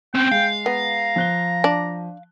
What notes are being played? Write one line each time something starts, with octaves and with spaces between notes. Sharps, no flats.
C4 C#4 G5
G#3 F5
B3 A#5
F3 F#6 G7
D4